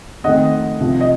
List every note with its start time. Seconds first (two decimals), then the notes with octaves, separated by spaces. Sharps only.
0.24 F2 D#3 A3 C4 D#5 F#5
0.81 C2 C3 F3
1.01 D#5